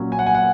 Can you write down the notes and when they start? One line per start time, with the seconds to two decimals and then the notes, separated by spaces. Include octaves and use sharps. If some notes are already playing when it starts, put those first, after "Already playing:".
Already playing: A#2 F#3 C#4
0.12 G#5
0.19 F#5
0.27 G#5
0.35 F#5